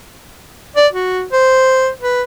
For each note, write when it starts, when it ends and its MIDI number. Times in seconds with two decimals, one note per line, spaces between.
0.76 0.87 74
0.92 1.24 66
1.32 1.89 72
2.01 2.22 71